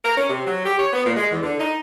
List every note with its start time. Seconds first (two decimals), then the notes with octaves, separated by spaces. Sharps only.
0.04 A#4
0.17 C#4
0.28 C3
0.46 F#3
0.65 G4
0.78 C#5
0.93 B3
1.05 A#2
1.16 G#3
1.30 E2
1.43 D3
1.59 D#4